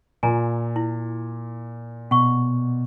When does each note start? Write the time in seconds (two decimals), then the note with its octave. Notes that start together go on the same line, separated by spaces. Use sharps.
0.23 A#2 G#5 A#5
0.76 E4
2.11 B2 F#5 C#6